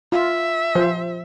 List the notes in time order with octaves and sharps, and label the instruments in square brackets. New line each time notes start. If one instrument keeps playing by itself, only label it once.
[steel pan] F4 [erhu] E5
[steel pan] F3 C5